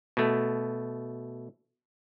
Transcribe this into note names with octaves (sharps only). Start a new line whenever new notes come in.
B2 A3